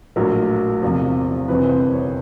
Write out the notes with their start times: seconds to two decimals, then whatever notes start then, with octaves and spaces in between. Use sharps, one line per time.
0.16 A#1 A2 F#3 A#4
0.82 E2 C3 F3
1.48 G1 F2 C3 E3 B4
1.69 C5
1.92 C#5